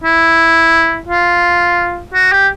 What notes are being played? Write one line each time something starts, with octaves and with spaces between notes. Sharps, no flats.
E4
F4
F#4
G4